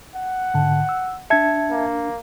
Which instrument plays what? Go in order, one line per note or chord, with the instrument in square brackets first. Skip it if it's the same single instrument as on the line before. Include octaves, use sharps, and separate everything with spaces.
[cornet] F#5
[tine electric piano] G#2 D3 A5
E6
[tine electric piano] D4 C#7 [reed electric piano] E5 A5 G#6
[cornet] A#3